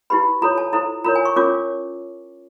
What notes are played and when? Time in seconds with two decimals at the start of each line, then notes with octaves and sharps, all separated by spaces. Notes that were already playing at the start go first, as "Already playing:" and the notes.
0.10 E4 G4 B4 B5
0.42 F4 A4 C#5 A#5
0.58 A5
0.73 E4 A4 C5 A#5
1.04 F4 A#4 C#5 A#5
1.15 G#5
1.25 C#6
1.36 C#4 F4 A#4 C#5 D6